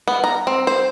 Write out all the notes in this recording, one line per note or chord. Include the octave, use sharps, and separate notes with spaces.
B3
A#5
C4
C5